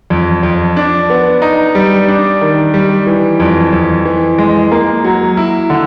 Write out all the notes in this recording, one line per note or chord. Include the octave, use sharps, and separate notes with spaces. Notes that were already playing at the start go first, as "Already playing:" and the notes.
F2
F2
D4
B3
D#4
G3
D4
D#3
G3
E3
F2
F2
E3
G#3
A#3
F#3
E4
D3